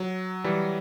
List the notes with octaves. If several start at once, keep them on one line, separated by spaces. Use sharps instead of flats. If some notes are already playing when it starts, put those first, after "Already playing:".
Already playing: F#3
E3 G3